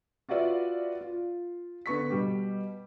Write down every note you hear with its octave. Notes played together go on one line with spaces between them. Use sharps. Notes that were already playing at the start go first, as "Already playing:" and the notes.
F4 F#4 B4 D5 E5 F5
F4
D3 B3 C#6 B6
B2 G3 G4